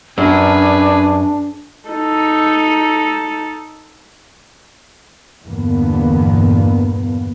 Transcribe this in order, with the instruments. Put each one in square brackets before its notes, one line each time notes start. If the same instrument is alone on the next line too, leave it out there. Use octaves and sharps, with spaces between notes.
[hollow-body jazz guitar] F#2 [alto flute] D4 [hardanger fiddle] G#4 B4
[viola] D#4 A4
[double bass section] E2 G2 A#2 D3 A#3 B3